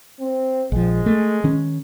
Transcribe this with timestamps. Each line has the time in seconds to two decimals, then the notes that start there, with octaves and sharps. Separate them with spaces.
0.20 C4
0.72 A#1 F3 G#3
1.06 A3
1.44 D#3 C#4